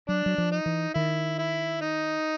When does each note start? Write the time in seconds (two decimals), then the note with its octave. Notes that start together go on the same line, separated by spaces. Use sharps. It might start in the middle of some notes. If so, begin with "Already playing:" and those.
0.08 F#3 D4
0.26 F#3
0.38 F3
0.52 D#4
0.66 E3
0.94 D#3 E4
1.38 E4
1.81 D#4